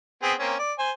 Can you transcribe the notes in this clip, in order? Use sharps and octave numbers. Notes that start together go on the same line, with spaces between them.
B3 C4 G#4
A#3 C4 C#4
D5
C5 G#5